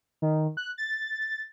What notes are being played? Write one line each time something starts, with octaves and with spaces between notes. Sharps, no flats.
D#3
F#6
A6